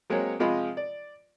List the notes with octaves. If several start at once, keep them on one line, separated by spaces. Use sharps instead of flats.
F#3 G#3 A#3 C4 C#5
C3 F3 G#3 F4 D#5 B5
D5